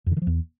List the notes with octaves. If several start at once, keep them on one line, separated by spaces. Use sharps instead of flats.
F2
D3
D#3
F3
E2